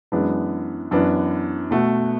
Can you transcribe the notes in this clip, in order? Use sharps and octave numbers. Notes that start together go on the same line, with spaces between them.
F#2 E3 G#3 B3 D4
F#2 E3 B3 D4
B2 A3 F#4